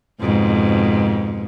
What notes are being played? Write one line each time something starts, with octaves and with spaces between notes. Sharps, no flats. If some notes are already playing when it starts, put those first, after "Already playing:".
F2 G#2 B2